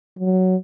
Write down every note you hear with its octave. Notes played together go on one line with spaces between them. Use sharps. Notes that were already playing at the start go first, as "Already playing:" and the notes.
F#3